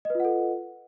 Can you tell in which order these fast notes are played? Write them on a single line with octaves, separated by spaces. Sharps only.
D#5 B4 F4 F#5 A4